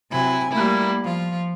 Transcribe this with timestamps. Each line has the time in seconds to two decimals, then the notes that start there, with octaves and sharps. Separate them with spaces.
0.12 C3 F#3 E4 G#5
0.51 G3 A3 A#3 E4
1.05 F3 F4